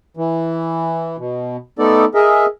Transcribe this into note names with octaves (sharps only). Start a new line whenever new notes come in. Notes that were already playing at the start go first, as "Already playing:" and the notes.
E3
B2
A3 B3 D#4 A4 D5
G#4 A#4 D#5 E5